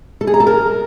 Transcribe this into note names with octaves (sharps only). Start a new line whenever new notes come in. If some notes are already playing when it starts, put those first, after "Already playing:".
A4
G#4
A#5
A4
A#4